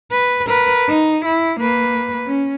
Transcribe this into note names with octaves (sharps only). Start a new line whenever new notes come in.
B4
A#4 B4
D#4
E4
A#3 B4
C#4